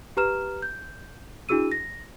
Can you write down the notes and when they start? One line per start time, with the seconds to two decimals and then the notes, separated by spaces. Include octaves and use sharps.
0.17 G4 B4 A#5 F6 E7
0.62 G6
1.49 D4 E4 F#4 G#4 E6 D#7
1.72 A#6